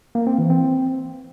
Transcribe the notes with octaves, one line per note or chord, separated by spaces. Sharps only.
A#3
C4
E3
C4